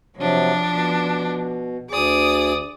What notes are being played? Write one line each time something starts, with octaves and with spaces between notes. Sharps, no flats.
C3 F3 F#3 D4
B2
D2 G#4 D5 D#6